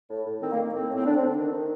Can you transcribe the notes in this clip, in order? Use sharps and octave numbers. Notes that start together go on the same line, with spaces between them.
A2
A2
D#3 C4
A#3
D#3
A#3
A2 C4
A2
C4
D3 D4
C4
D3
D4
D#3 D4
D#3